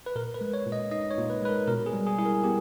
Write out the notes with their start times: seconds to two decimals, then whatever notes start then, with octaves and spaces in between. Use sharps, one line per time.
0.06 B4
0.16 A#2 A#4
0.34 B4
0.41 G#3
0.54 C#5
0.66 A#2
0.72 D#5
0.91 D#4 D#5
1.10 C#5
1.18 A#2
1.30 B4
1.42 G#3 B4
1.49 A#4
1.67 B2 A#4
1.86 G#4
1.94 G3
2.07 G#4
2.18 E4 G#4
2.26 A#4
2.43 B3 G4